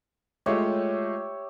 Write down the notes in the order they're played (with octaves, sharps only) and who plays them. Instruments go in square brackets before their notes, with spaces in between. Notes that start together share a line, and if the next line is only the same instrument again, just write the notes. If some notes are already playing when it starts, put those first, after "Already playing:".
[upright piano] G#3 A3 F4 [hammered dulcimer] G4 C#5 E5